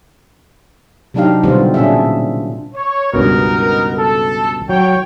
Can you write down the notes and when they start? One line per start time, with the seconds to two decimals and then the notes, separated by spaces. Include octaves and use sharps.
1.14 C3 F#3 D4 D#4 G4 F5
1.43 B2 D3 G3 B3 C4 F4
1.74 A#2 C#4 D4 G#4 E5
2.75 C#5
3.14 C#2 G2 B2 B3 D#4 A#4
3.97 A4
4.69 F#3 C#5 G5